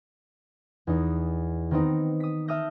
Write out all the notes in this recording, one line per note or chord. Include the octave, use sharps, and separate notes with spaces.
E2 D#4
D#3 B3 C4 D#4
D#6 B6
E5 A5 D#6 F6 G6 A#6